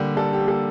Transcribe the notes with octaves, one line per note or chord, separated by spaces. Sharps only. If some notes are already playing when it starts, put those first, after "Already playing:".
Already playing: D3 G3 A#3 G4
G3 A4
G4
A#3
A4